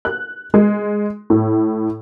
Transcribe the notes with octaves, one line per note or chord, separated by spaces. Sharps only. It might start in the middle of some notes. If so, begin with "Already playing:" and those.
F#6
G#3
A2